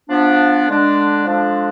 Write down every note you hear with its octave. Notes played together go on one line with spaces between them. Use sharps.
F3 B3 D4
D3 G#3 D4
F3 G#3 D4 A4